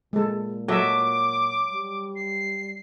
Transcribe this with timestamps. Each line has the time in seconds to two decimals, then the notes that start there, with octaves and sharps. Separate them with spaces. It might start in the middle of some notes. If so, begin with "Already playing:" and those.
0.13 A#2 G#3 A4
0.68 F#3 A4 D#5 E5 D6
1.73 G3
2.16 C7